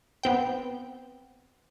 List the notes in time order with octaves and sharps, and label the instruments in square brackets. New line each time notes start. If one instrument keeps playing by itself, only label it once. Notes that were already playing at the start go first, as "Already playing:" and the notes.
[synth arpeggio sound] B3 C4 G5